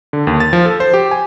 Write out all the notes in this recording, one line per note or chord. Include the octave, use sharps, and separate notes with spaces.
D3
D#2
A6
F3
A4
C5
G4
G#5